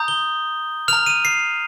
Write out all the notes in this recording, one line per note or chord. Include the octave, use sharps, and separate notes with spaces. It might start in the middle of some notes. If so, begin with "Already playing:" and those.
Already playing: A#5 D#6 G6
G7
A#5 F6 F7
D#7
C7